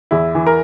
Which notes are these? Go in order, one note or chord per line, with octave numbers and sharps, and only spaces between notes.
E2 E4
E3
A#4